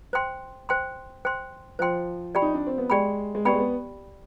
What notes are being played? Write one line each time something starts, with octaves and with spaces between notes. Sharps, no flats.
C5 G5 C6
C5 G5 C6
C5 G5 C6
F3 C5 G5 C6
G4 D5 G5 B5
D#4
D4
C4
B3
G#3 G4 D5 G5 B5
G#3
B3 G4 D5 G5 B5
G#3
B3